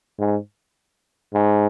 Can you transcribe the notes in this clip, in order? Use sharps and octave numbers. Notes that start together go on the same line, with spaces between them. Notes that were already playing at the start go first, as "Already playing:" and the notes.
G#2
G#2